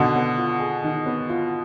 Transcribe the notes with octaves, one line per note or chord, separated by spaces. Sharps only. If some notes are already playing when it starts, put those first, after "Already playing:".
Already playing: B2 D3 D#3
B3
F4
G#4
D#3
B3
F4